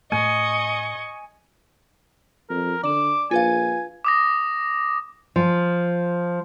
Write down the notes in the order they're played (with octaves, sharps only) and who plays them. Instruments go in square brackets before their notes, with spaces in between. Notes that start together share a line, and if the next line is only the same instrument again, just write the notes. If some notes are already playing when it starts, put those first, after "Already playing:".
[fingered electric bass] A2 A3 [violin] D#5 C#6 [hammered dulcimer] G#5
[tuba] F2 [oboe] A#4
[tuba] D3 [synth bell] D5 E7 [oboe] D6
[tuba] A#1 [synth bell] F4 B4 F5 [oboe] G#5
[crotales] D6 D#6 A#6
[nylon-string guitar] F3